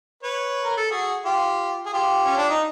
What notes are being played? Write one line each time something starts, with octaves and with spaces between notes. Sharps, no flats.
B4 C#5
A#4
A4
F#4 G#4
F4 G4
G#4
F4 G4
C#4
D4
D#4